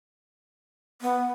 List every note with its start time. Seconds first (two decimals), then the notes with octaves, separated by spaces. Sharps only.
1.02 B3